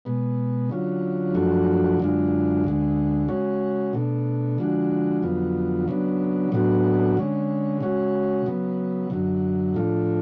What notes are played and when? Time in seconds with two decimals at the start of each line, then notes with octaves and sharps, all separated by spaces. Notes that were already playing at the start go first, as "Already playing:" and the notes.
0.05 B2 G#3 B3
0.70 D3 F#3 C#4 F4
1.34 F#2 F3 A3 D4 F#4
2.00 F#2 D3 G#3 D4 F4
2.64 D2 D3 G#3
3.28 C#3 G#3 C#4 F#4
3.93 B2 A3 D4
4.58 D3 F3 G#3 D4 F#4
5.22 F2 D3 F#3 B3 F4
5.88 C#3 F#3 B3 D4
6.52 A2 F#3 B3 D4 F#4
7.17 D3 G#3 C#4
7.80 C#3 G#3 C#4 F#4
8.46 C#3 F#3 B3
9.10 F#2 D3 F#3
9.74 A2 F3 A3 D4 F4